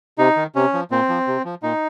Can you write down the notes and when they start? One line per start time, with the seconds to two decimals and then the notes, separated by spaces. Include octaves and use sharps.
0.18 C3 D#4
0.36 D#3
0.55 C3 C#4
0.74 F3
0.91 A#2 C4
1.09 F3
1.27 C3
1.45 F3
1.63 A#2 D#4